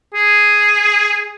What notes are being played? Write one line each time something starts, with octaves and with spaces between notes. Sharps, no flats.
G#4